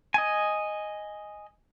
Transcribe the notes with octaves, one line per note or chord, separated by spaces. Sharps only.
D#5 G#5